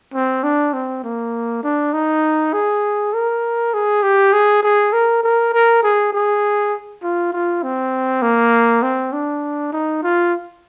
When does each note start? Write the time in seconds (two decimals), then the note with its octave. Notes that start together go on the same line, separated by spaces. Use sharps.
0.14 C4
0.43 D4
0.73 C4
1.04 A#3
1.63 D4
1.93 D#4
2.53 G#4
3.13 A#4
3.74 G#4
4.03 G4
4.33 G#4
4.63 G#4
4.93 A#4
5.23 A#4
5.53 A#4
5.83 G#4
6.13 G#4
7.02 F4
7.33 F4
7.63 C4
8.22 A#3
8.82 C4
9.13 D4
9.72 D#4
10.03 F4